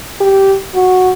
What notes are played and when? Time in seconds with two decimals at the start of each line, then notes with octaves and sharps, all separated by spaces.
0.21 G4
0.75 F#4